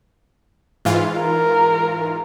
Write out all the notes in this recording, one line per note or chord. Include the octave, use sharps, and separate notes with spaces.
G#2 E3 F4
A#4